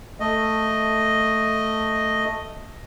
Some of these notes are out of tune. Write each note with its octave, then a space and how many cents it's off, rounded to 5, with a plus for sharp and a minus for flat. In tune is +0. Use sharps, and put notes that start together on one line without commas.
A3 +5 D#5 +0